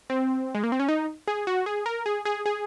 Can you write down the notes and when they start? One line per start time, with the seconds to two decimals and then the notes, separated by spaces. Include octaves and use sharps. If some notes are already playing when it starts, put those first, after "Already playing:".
0.10 C4
0.55 G#3
0.64 A#3
0.72 C4
0.80 C#4
0.89 D#4
1.28 G#4
1.47 F#4
1.66 G#4
1.86 A#4
2.06 G#4
2.25 G#4
2.46 G#4